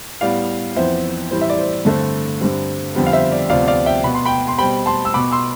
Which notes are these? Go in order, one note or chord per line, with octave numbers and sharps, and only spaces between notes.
A2 G3 B3 D5 F5
F2 E3 B3 C5 E5
A2 E3 G3 C4 C5
E5
D5
C5
G2 D3 A3 C4
G2 D3 G3 C4
F2 D3 G3 B3 C5
F5
C5 E5
D5
D2 C3 F3 B3 D5 F5
D5 F5
E5 G5
B2 B3 B5
C6
G5 B5
C6
B2 G3 C4 G5 B5
A5 C6
E6
B2 B3 B5 D6
C6 E6